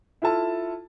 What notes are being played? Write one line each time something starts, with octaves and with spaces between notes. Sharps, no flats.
E4 F4 A4 A5